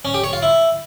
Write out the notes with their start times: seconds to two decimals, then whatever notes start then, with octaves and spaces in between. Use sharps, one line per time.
0.05 C#4
0.14 G4
0.24 C#5
0.33 F4
0.42 E4